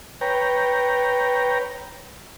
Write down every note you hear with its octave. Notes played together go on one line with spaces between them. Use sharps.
B4 C#5 G5 A#5